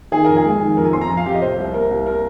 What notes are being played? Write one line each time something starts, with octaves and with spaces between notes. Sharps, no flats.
D#3 G#4
F2 A#4
G#4
G#3
D#3
F2 A#4
G#5
C4 C6
A#5
F2 G#5
F5
F2 G4
D#5
C3 C5
C2
A#3 A#4
C2
A#3 A#4